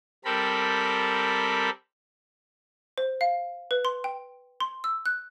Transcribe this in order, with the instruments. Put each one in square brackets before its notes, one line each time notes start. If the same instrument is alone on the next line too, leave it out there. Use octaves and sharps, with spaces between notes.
[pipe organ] G3 C4 A4 A#4 B5
[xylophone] C5
F5
B4
C6
G5
C6
E6
F#6